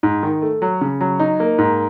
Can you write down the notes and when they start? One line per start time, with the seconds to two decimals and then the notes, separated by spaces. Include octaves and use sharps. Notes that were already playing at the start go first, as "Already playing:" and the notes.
0.03 G#2
0.23 D#3
0.42 A3
0.62 F#3
0.81 C#3
1.01 F#3
1.19 D#4
1.40 A#3
1.58 G#2